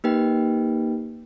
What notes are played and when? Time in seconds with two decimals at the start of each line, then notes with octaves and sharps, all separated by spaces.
0.04 A#3 D#4 G4 B4 G5